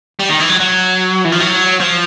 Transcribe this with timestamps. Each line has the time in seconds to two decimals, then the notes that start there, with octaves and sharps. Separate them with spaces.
0.19 G3
0.29 D#3
0.40 E3
0.49 F#3
0.60 F#3
1.25 E3
1.32 F3
1.40 F#3
1.80 F3